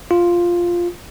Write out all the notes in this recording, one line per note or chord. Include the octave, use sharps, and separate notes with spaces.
F4